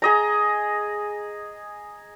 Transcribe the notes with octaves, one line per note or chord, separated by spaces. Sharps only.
G#4 D#5 A#5